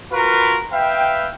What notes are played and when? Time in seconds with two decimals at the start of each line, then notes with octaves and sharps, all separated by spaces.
0.12 F4 F#4 A#4 B4 F5
0.72 B4 E5 F5 G5